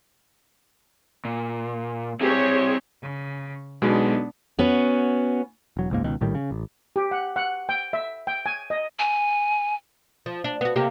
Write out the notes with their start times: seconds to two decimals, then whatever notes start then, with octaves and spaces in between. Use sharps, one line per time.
1.25 A#2
2.21 C4 E4 G4 G#4 C#5
3.02 C#3
3.82 B1 B2 G#3 B3 D4
4.59 B3 C#4 F#4
5.77 E1 F#3
5.90 F#1 C#2 G#2 A#3
6.04 C#2 B2 D#3
6.21 A#1 A2 D#3 G3
6.34 C#3
6.51 A1
6.96 G4
7.11 F#5
7.36 F#5
7.69 G5
7.93 E5
8.27 G5
8.46 G#5
8.70 D#5
8.99 G#5
10.26 F3
10.44 D4
10.61 B3 F#4
10.76 C3 A#3 G4